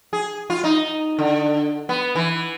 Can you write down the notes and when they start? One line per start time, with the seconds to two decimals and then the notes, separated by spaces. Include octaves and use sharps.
0.13 G#4
0.50 F4
0.64 D#4
1.19 D3
1.89 B3
2.16 E3